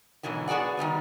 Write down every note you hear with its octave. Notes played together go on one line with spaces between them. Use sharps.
G#2 B2 D3 E3 F#3
B3 F#4 G#4 D5 F#5
D#3 F3 G3 B3